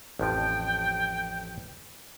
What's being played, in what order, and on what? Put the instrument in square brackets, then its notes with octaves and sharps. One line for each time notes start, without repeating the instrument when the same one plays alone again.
[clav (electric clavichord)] A1 F2 F3 [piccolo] G5